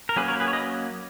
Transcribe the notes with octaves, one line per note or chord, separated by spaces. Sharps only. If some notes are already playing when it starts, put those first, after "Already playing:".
A#4
F#3 A#3 C#4 G#4 B4
A#4 C#5
G#4 B4
C#5
B4 D#5